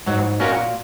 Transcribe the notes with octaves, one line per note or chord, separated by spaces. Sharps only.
G#2 F#3
A#2 C#4 F#4 A#4